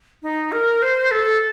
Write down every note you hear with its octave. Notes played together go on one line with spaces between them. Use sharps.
D#4
A#4
C5
A4